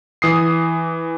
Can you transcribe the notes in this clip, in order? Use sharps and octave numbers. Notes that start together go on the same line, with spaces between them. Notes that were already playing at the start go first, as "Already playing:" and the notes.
E3 D#6 C7